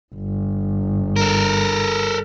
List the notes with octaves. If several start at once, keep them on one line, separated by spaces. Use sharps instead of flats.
G1
A4 A#4